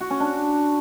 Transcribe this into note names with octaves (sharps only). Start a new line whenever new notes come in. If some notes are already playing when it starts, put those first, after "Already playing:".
F#4
C#4
D4